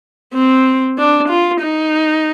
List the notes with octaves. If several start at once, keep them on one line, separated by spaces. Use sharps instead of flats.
C4
D4
F4
D#4